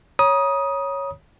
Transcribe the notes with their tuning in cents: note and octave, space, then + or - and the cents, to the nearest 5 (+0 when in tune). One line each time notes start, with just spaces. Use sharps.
C#5 +0 A#5 +45 D#6 +5